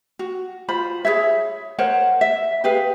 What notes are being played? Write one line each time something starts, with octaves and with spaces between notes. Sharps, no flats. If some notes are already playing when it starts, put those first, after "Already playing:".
F#4
F4 C5 B5
G#4 C5 C#5 E5
A#4 C5 C#5 F#5
E5
G4 G#4 B4 F5